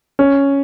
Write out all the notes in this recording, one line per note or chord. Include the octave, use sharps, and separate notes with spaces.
C#4